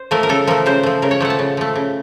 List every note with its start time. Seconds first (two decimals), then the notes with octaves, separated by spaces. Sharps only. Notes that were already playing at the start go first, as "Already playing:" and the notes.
Already playing: C5
0.11 F3 A3 A#4
0.23 A#4
0.29 C#3 A4
0.47 F3 A3 A#4
0.66 C#3 C5
0.83 F3 A3
1.02 C#3 A#4
1.11 C#5
1.21 F3 A3 F#5
1.30 A5
1.39 C#3
1.57 F3 A3
1.76 C#3